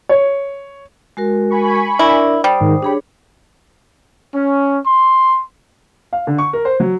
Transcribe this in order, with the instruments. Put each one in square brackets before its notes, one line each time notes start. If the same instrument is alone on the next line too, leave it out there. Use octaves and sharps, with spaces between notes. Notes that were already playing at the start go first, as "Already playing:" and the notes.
[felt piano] C#5
[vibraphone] G#3 F#4 A#4
[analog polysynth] G#5 B5 C#6
[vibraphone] D4 A#4 D5 [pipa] E4
[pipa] G3 [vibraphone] C5 D#6
[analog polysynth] G#2 D#3
[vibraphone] D4 G#4 C#5 [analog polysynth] G4 B5
[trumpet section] C#4
C6
[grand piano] F5
D3
C#6
A#4
C5
F#3